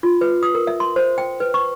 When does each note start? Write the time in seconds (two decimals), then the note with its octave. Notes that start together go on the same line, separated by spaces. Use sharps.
0.03 F4
0.21 B4
0.43 D#6
0.55 A#4
0.67 E5
0.80 C6
0.96 C5
1.18 G5
1.40 B4
1.54 C#6